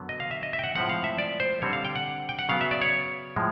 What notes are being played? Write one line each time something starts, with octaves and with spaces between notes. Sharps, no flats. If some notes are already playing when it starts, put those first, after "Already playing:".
Already playing: F#2 D3 F#3 B3
D#5
F5
E5
D#5
E5
G5
F#5
A2 F3 G#3 C4 F#5
F5
E5
D5
C5
D3 G3 C4 C#5
F5
G5
F#5
G5
F#5
C#3 F#3 B3 F5
E5
D5
C#5
A2 F3 G#3